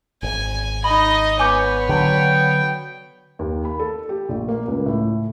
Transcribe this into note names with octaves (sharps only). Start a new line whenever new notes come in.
G#1 G#5
D#4 D#5 B5
B3 C#5 G#5 D6 G6
D3 F#3 G5
D#2
B5
A4
G4
A#1
A#3
C#2
A2